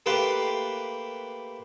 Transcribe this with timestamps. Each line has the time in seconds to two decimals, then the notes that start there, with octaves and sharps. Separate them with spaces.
0.06 A3 A#3 G4 B4 C6